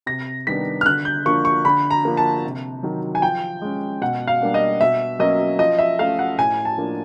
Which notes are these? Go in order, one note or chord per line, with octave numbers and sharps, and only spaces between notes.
C3 A#6
D#3 G3 B3 D4 B6
F6
D3 F#6
G6
F3 A#3 D4 C#6
C#6
D3 B5
A#5
F3 A#3 D4
A5
C3
D#3 F#3
G#5
F3 G5
G#3 C#4
B2 F#5
F5
G3 A#3 D4
D#5
B2 E5
F#3 A#3 C#4 D#5
F3 D#5
E5
A3 C#4 F5
F#5
A2 G#5
A5
F3 A#3 D4